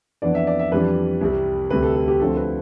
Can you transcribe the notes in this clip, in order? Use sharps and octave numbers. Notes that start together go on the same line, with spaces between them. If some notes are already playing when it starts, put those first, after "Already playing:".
F2 E3 B3 D4 D5
E5
D5
E5
F2 E3 G3 D4 B4
C2 C3 G3
D2 C3 G3 B4
A4
A4
G4
D2 D3 F3 C4 A4
B4